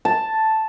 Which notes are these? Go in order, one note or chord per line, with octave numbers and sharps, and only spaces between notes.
A5